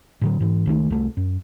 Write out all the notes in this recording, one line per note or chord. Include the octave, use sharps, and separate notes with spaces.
A2 D3 F#3
G#2 E3
C#2 D#3 F#3 A3
C2 A3
F#2